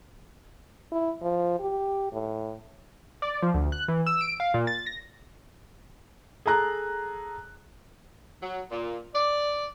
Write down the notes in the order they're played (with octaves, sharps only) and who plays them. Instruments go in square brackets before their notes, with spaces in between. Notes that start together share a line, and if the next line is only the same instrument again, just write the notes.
[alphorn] E4
F3
G4
A2
[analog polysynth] D5
F3
D2
F#6
E3
E6
D7
F5
A#2
A6
A#6
[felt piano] G#4 A4 A#5 F#6
[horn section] F#3
A#2
D5